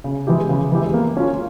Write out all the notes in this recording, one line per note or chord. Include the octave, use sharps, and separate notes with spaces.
C#3
E3 G#3 E4 G4
C#3
E3 G#3 E4 G4
A#3
C#4 F4